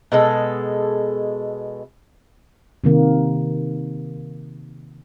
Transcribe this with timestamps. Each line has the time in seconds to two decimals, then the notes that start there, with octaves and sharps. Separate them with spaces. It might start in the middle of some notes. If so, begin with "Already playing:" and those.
0.12 B2 G#3 A4
2.84 C3 D#3 A#3